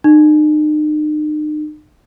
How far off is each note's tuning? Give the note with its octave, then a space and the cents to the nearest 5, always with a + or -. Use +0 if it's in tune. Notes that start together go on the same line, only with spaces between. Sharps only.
D#4 -40